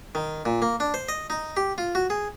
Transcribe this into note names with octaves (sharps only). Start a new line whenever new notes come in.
D#3
A#2
A#3
D4
C5
D#5
D#4
G4
F4
F#4
G#4